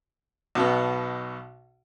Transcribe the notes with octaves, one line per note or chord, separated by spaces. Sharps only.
B1 B2 B3